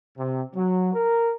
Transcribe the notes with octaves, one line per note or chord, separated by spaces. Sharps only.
C3
F#3
A#4